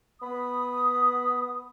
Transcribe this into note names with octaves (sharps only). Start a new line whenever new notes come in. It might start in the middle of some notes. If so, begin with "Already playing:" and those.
B3 B5 D#6